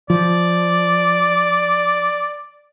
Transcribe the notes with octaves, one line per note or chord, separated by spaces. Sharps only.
F3 D5